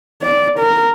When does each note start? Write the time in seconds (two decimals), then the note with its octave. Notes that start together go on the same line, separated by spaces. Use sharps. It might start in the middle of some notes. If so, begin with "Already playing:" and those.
0.22 D5
0.59 A#4